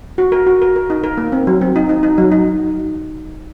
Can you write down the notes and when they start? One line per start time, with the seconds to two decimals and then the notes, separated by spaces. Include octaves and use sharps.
0.18 F#4
0.32 A#4
0.47 F#4
0.62 A#4
0.76 A#4
0.90 D#4
1.04 A#4
1.18 A#3
1.32 C4
1.47 F#3
1.61 C4
1.76 D#4
1.89 D#4
2.03 D#4
2.18 F#3
2.32 D#4